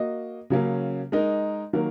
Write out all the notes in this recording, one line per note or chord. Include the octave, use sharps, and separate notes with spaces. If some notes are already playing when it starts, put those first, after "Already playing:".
Already playing: A#3 F#4 D#5
C#3 F#3 A#3 C#4
G#3 D#4 A#4 D#5
D#3 F#3 A#3 F#4 A#4